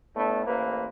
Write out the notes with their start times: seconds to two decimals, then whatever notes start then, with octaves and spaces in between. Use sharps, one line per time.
0.15 A2 A3 B3 D4
0.46 A1 A#3 B4 C5